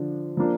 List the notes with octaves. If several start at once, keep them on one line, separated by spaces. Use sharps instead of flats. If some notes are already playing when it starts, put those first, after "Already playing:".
Already playing: D3 F3 D4
F3 A#3 D4